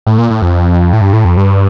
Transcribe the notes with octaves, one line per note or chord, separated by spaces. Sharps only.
A2
A#2
A2
F2
A2
G2
A2
F2
G2